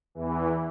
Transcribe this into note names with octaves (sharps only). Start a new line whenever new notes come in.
E2 E3